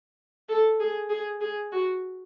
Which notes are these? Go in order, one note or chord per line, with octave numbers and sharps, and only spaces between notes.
A4
G#4
G#4
G#4
F#4